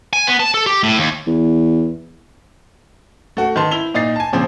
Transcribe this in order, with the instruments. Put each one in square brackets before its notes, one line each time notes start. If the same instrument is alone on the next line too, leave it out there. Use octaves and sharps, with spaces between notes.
[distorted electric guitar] G#5
B3
A5
A4
G4
A2
D#2
[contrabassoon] E2
[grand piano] A3 F#4
D#3 B4 A5 C6
E4 F7 G7
A#2 D#4 A6 C7
G#5 A5
A#2 C#3 F3 C4